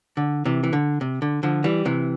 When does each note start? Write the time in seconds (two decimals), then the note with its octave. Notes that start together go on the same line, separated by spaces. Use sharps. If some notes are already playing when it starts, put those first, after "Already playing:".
0.17 D3
0.45 C3 E3
0.63 E3
0.73 D3
1.01 C3
1.22 D3
1.43 D3 F3
1.64 E3 G3
1.85 C3 E3